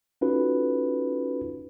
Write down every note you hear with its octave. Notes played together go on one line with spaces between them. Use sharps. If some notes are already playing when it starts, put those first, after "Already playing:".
C#4 D#4 F4 F#4 A4 B4